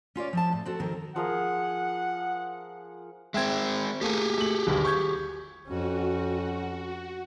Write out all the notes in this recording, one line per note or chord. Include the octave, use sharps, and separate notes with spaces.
C#4 F4 C#5 D5
F3 C4 A5
A2
C4 F#4 A4
F2 D#3 C4 A#4
F3 G#4 A#4 F#5
G#3 C4 E5 G5 G#6
A3 A#3 G4 G#4
A3 F#7
G1 D#2 G3
C#6 G6 G#6
F2 C#4 F#4